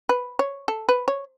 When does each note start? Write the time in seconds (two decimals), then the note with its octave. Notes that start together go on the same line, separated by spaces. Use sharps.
0.09 B4
0.39 C#5
0.68 A4
0.89 B4
1.08 C#5